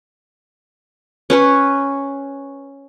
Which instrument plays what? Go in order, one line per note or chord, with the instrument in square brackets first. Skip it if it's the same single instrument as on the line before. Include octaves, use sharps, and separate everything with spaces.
[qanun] C#4 B4 C#5